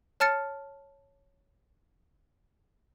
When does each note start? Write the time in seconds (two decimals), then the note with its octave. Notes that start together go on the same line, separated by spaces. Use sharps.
0.20 C#5 A5 F6 A6 C#7